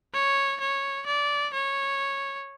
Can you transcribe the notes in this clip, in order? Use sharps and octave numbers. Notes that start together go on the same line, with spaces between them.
C#5
C#5
D5
C#5